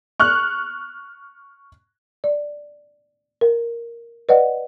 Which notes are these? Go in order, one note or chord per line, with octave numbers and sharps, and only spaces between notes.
C#6 F6 F#6
D5
A#4
B4 D5 D#5 F#5